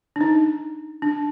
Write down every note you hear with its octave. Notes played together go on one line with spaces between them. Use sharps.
D4
D#4
D4